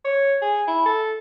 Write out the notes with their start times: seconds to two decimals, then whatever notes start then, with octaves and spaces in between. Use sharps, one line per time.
0.05 C#5
0.42 G#4
0.68 E4
0.86 A4